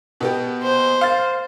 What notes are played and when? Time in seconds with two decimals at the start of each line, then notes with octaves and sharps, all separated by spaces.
0.20 B2 B3 G4
0.63 C5
1.01 F5 A6